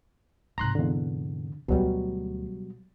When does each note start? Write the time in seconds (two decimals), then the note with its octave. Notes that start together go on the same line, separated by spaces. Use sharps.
0.58 G#2 C3 A#5 C6 F#6
0.75 E2 D3
1.68 D2 B2 F#3 G3 F4